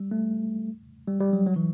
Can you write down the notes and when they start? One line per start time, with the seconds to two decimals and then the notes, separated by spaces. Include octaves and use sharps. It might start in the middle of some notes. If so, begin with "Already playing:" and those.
Already playing: G3
0.11 A3
1.08 G3
1.20 G3
1.33 F#3
1.46 F#3
1.56 E3